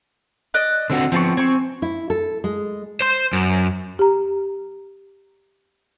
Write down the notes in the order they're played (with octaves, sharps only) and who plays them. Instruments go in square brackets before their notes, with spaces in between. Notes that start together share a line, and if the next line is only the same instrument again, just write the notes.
[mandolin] D5 D#5 F#6
[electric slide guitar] D3 C4 F#4 [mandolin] E6
[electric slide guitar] F3 B3 [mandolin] C4 A5 C#6
[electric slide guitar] C4 [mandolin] G#5 C#6
[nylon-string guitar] E4
A4
G#3
[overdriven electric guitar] C5 C6
F#2
[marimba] G4 A#5